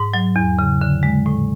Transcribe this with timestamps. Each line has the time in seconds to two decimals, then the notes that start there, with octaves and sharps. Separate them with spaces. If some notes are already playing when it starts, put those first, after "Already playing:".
Already playing: G#2
0.14 F#3
0.36 E2
0.59 C#3
0.81 D3
1.03 G#3
1.26 A2